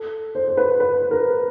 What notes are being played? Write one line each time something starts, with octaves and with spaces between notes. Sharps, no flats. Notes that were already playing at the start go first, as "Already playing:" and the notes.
Already playing: A4
C5
C5
B4
B4
A#4